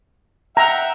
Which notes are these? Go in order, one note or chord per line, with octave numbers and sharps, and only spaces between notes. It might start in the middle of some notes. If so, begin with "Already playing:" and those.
E5 F#5 G5 A#5